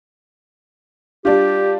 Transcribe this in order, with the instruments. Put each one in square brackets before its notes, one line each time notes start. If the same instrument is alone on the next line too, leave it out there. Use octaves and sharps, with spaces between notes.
[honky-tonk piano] G3 D4 F4 [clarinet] G4